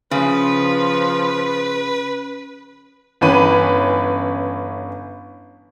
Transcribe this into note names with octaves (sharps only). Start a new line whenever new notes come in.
C#3 F3 C#4 B4
G1 E3 C#4 B4 B5 D#7